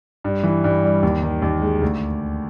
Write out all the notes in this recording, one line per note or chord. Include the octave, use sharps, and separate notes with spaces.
G2
E3
G2
G3
D#2
D#3
D#2
G#3
D2